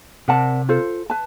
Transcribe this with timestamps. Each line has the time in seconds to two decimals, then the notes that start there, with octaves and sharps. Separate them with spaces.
0.28 C3 A#4 D5 F#5 A5
0.69 F4 A4 C5
1.10 B4 A5